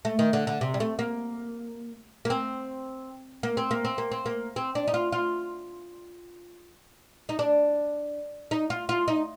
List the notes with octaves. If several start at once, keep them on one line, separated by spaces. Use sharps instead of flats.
A3
D#3
D3
D3
C3
G3
A3
A#3
A#3
C4
A#3
C4
A#3
C4
A#3
C4
A#3
C4
D4
D#4
F4
F4
D#4
D4
D#4
F4
F4
D#4